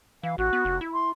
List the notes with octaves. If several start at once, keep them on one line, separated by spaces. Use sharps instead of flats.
E3 F5
A1 F#4
B3
F1
E4
C6